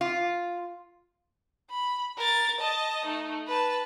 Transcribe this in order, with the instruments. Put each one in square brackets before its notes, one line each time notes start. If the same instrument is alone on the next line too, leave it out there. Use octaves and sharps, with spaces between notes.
[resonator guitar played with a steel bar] F4
[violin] B5
A#4 A6
D#5 A5
A3 D#4
B4 A5